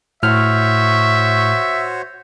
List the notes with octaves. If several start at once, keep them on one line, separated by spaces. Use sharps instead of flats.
A2 F#4 C5 C#5 E5 F6